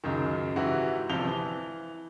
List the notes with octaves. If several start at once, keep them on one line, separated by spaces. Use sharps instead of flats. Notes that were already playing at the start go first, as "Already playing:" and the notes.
C#2 F#2 D#3
G#2 E3 E4 F#4 G4
G1 C3 F3 F7 G7
E3